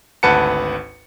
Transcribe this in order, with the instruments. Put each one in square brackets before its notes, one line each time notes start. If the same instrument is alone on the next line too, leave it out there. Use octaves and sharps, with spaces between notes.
[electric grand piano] G#1 D2 B4 F#5 A5 C#7